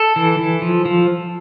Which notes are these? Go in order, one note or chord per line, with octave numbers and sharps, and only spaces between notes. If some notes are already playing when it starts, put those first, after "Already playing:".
Already playing: A4
E3
E3
F3
F3